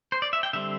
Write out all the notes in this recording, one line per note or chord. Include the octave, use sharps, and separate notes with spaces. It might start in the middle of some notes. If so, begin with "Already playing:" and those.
C5
D5
E5
G5
D3 G3 C4 E5